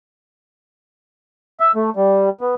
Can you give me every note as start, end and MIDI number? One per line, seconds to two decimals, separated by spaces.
1.60 1.72 76
1.75 1.90 57
1.96 2.29 55
2.41 2.55 59